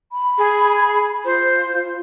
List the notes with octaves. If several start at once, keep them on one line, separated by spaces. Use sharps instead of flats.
B5
G#4
F4 C5